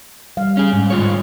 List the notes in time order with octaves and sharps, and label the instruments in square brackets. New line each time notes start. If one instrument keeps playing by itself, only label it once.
[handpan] G3 F5
[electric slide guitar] C#4 G#4
G#2
G#2 F4 C#5